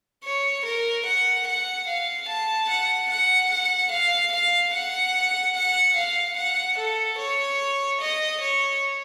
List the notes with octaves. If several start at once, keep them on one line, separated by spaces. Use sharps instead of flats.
C#5
A#4
F#5
F#5
F5
A5
F#5
F#5
F#5
F5
F5
F#5
F#5
F5
F#5
A4
C#5
D#5
C#5